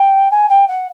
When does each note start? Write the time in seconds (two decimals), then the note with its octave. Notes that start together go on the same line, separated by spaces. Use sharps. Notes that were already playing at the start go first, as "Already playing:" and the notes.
Already playing: G5
0.31 G#5
0.49 G5
0.67 F#5